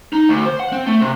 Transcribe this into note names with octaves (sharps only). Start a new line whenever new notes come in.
D#4
D2
C5
F#5
C4
A3
C3